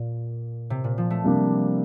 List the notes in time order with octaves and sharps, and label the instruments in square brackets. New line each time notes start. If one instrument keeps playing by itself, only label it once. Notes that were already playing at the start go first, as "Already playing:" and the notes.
Already playing: [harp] A#2
C3
A#2
F3
A3
[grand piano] C3 G3 A#3 D4